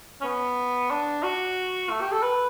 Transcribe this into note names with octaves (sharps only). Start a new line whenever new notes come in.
C#4
B3
D4
F#4
A3
G4
A4
B4